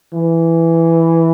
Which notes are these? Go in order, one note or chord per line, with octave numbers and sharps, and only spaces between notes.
E3